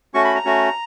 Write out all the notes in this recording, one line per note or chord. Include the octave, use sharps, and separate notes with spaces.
A3 C#4 F#4 C#6
B5
A#5
A3 C#4 F#4